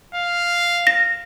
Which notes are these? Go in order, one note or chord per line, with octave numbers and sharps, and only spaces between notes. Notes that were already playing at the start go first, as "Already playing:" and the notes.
F5
A#6